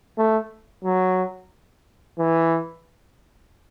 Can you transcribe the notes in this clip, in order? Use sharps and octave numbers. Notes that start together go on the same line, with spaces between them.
A3
F#3
E3